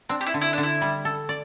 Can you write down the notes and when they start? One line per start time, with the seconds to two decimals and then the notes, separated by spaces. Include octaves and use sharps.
0.09 C4 D4
0.21 G4
0.26 E4
0.34 D3
0.41 E4
0.53 D4
0.58 D3
0.63 E4
0.82 G3
1.05 A4
1.29 D5